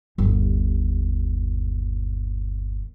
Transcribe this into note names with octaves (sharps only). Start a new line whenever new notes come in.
G1 D#2